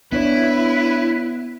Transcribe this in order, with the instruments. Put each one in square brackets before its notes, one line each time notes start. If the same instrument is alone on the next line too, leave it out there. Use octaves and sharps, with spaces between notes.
[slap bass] B3 [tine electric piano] D4 C#5 D5 [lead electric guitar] E4 [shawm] B4